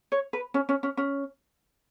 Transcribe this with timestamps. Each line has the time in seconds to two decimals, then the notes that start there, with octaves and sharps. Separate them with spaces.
0.12 C#5
0.33 B4
0.54 C#4
0.69 C#4
0.83 C#4
0.97 C#4